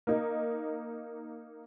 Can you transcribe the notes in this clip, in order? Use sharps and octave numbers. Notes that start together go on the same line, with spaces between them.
A#3 D#4